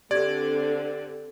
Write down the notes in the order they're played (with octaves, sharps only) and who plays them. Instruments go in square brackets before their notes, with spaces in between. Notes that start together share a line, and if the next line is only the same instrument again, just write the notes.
[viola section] D3 C4 [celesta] G4 G#6 [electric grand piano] D5